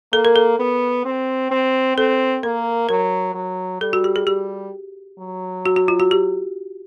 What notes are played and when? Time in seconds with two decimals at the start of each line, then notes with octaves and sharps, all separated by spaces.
0.13 A#3 A4
0.25 A#4
0.36 A4
0.59 B3
1.05 C4
1.51 C4
1.97 C4 A4
2.43 A#3 A#4
2.89 F#3 A#4
3.35 F#3
3.81 G3 A4
3.93 F#4
4.04 G4
4.16 G#4
4.27 G3 G4
5.19 F#3
5.66 F#4
5.76 F#4
5.88 F4
6.00 F#4
6.11 G4